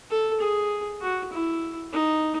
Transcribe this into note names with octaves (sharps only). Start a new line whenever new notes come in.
A4
G#4
F#4
E4
D#4